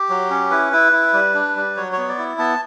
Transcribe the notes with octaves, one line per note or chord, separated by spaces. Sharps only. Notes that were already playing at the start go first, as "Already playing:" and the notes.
Already playing: G4
F#3
C#4
E4 B4
E4
E4
G3
D4
G3
F#3 C#5
C#5
B3
D5
E4
B3 A5